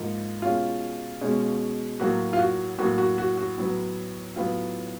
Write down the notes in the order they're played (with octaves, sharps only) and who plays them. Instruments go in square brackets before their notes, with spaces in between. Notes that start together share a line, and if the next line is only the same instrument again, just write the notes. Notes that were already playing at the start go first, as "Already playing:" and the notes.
Already playing: [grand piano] G#2 F3 A#3
B2 G#3 C#4 F4
B2 G#3 C#4
A2 F#3 A#3 F#4
F4
F#4
A2 F#3 A#3 F#4
F#4
F#4
F#4
A2 F#3 B3
A2 F#3 B3 F4